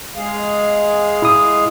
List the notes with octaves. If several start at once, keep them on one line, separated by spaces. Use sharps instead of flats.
G#3 G#4 F5
E4 D#6